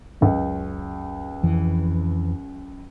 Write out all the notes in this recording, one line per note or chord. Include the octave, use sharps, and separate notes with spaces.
C#2 F#2
F2 E3